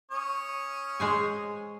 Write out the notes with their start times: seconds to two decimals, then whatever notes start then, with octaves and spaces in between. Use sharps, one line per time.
0.11 C#4 C#5 D#6
1.00 G#3 C5 G#5